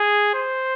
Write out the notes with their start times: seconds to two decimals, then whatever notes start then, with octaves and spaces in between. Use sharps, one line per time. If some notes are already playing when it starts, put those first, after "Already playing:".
Already playing: G#4
0.35 C5